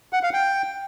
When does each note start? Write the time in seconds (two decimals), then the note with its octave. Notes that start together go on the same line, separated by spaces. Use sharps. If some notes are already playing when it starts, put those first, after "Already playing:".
0.13 F#5
0.23 F5
0.33 G5